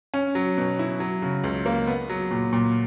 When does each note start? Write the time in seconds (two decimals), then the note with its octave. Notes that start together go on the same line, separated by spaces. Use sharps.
0.14 C#4
0.35 F#3
0.58 B2
0.79 E4
1.00 F#3
1.22 C#3
1.44 C#2
1.66 A#3
1.87 B3
2.09 F#3
2.31 A#2
2.53 A#2